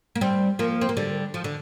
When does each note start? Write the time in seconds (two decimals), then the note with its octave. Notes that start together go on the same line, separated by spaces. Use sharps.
0.16 A#3
0.21 G3 C4
0.59 F3 A#3
0.81 C4
0.89 A#3
0.97 D3 G3
1.34 F3
1.44 D3